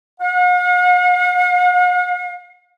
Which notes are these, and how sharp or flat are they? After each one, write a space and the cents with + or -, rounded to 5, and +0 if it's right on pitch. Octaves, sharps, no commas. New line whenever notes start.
F#5 -45